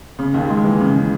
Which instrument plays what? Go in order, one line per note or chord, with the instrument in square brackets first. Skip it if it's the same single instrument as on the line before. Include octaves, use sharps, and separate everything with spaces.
[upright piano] C#3
D#2
G#3
E3
C#3